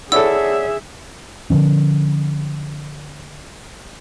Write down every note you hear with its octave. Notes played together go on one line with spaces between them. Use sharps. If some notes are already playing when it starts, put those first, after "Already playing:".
E4 G#4 A4 C#5 D5 E5 F#5 E6
D3 D#3 F3 C#4